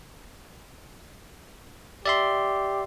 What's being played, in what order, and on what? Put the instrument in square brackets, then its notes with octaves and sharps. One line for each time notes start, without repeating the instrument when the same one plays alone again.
[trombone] G4 [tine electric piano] D5 E5 C6